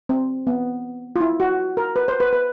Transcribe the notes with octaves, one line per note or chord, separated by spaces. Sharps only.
C4
B3
F4
E4
F#4
A#4
B4
C5
B4
B4